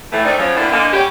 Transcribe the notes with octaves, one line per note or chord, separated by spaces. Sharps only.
A2 E3 A3
D#3 A3 C4 D#4 D5
C#3 F3 F#3
A2 D3 A#3 B3 E4 D5
D3 G#3 A#3
G3 C#4 F#4 G4